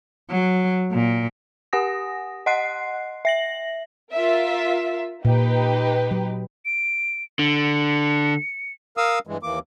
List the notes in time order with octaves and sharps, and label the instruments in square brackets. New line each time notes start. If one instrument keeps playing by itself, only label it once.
[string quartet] F#3
A#2
[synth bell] G4 F#5 G#5 D#6 A#6
D#5 F#5 C6 F#6 C7
E5 A#6 F#7
[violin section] F4 A#4 E5
[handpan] A#2 [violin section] D#4 G4 B4
[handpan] F#3
[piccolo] D7
[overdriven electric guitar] D3 [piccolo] C#7
[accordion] A#4 F5 D#6 E6
G2 E3 G#3
D#2 E3 A#3 D6